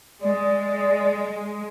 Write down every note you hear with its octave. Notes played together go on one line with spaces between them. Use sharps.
G#3 D5